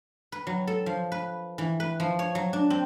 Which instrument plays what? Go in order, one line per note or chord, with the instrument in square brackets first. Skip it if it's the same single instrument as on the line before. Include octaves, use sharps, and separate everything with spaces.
[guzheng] B4
F#3
A4
F3
B4
E3
B4
F3
C#5
F#3
D4
C4